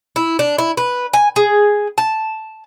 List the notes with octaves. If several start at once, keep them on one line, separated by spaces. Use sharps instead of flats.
E4
D4
E4
B4
G#5
G#4
A5